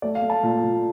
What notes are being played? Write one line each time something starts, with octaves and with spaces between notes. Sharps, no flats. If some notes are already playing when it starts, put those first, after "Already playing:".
A3 D5
F5
A3
A5
A#2
A#2